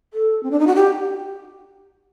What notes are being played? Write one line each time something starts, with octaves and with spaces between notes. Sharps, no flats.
A4
C4
D4
D#4
F#4
G4